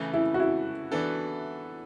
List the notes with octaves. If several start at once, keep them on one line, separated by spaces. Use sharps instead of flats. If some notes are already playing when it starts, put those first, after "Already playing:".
Already playing: C#3 E3 A3
E4
F#4
E4
E3 B3 D4 A4